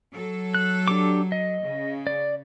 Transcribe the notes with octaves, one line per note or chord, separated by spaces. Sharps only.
F#3 A4
F#6
D4 G4 D6
D#5
C#3
D5